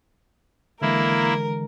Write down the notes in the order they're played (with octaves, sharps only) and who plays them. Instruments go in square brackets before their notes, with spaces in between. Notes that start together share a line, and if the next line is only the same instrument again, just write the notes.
[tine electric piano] D3 E3 G#3 [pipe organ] A#3 E4 [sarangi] A#4